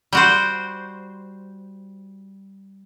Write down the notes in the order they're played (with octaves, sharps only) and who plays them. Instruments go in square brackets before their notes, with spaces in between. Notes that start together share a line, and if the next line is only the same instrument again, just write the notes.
[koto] G3 F#4 C5